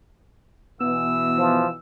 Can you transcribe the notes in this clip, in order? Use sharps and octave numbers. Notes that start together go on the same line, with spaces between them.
B2 E3 B3 E6
F3